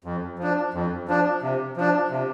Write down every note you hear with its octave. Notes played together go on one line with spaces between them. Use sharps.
F2
F3 D4
F2
F3 D4
C3
F3 D4
C3